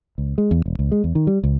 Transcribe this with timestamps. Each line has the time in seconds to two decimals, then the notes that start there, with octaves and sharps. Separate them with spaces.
0.18 C#2
0.38 G#3
0.51 E2
0.66 E1
0.79 C#2
0.92 G#3
1.04 E2
1.15 D#3
1.27 G3
1.43 C#2